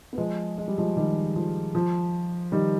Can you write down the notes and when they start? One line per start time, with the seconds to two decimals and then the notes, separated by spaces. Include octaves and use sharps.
0.13 B3
0.18 F3 G#3
0.58 G#3
0.68 G3
0.78 F3 G#3
0.97 D#3 G3
1.36 F3
1.75 F3
2.52 D#3 G3